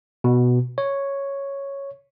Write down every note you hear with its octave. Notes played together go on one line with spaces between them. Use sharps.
B2
C#5